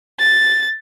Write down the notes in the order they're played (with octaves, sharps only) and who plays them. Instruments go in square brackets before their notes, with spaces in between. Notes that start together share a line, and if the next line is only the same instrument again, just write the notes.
[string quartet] A6